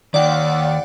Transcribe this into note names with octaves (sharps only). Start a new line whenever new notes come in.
D#2 D#3 D5 F#5 G5